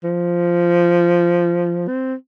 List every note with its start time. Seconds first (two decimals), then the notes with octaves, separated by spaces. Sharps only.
0.04 F3
1.88 C4